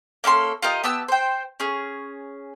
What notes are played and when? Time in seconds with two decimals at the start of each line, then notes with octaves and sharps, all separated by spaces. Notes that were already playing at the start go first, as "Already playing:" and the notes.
0.24 A#3 C#4 A4 C6
0.62 F4 G4 A#4 D#5
0.84 B3 G4 A5 E6
1.08 C5 G5
1.60 C#4 G#4